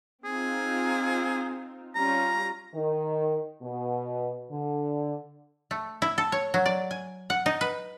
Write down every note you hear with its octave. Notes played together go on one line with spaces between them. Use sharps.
C4 D#4 F4 G#4
G3 C#4 F4 A#5
D#3
B2
D3
A3
E4
A4
C#5
F#3
D5
G#5
F#5
D#4
B4